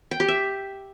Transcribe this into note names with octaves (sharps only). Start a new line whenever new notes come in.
G5
G4
E5